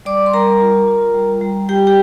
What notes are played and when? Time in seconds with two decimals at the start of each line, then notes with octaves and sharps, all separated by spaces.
0.05 G3 D5 D6
0.26 C6
0.33 G3 A#4 A#5
0.61 F4
0.88 F4
1.14 G3
1.41 G3
1.69 G3 G4 G5
1.87 G4 G5